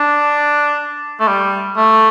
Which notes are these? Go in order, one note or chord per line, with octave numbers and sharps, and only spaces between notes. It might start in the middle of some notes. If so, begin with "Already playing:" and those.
Already playing: D4
A3
G3
A3